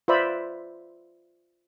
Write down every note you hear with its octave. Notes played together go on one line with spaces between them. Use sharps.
F4 B4 C5 D5 E5 B5